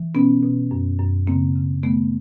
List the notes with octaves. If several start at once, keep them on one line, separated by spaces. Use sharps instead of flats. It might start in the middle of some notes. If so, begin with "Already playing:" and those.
Already playing: E3
B2 B3 C#4
B2
F#2
F#2
C#3 A#3 C4
C#3
D#3 A3 B3